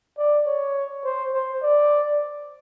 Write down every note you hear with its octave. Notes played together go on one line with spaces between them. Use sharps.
D5
C#5
C5
C5
D5